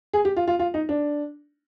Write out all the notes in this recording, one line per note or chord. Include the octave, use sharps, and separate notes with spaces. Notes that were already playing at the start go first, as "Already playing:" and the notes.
G#4
G4
F4
F4
F4
D#4
D4